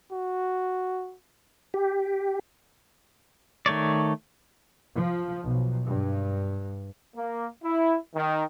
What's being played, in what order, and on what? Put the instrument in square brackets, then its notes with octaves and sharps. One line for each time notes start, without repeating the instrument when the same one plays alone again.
[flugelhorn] F#4
[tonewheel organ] G4
[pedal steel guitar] D#3 A3 C#5 D5
[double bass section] F3
B1
G2
[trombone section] A#3
E4
D#3